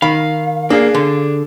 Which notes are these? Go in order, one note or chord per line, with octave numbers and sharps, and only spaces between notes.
D#3 F5 B5
A#3 D4 G#4
D3